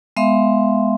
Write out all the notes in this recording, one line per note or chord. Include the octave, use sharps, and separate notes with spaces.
G#3 B3 E5 F5 C6